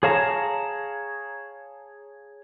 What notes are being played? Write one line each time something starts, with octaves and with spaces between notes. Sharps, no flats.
G#4 C#5 F5 A5 A#5